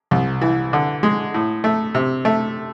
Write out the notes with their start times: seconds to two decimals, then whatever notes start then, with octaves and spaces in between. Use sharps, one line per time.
0.11 C2
0.41 E3
0.73 D3
1.03 G#3
1.34 A2
1.64 A3
1.95 C3
2.25 A3